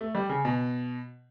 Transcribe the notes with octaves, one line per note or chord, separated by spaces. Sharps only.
A3
G3
C#3
B2